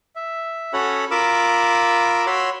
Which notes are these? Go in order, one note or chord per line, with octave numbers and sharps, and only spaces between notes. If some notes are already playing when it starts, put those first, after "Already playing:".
E5
C#4 F#4 A4 C#5 F#5 B5
F4 A#4 B5 D6 E6
F#4 C#5 B5 C6 E6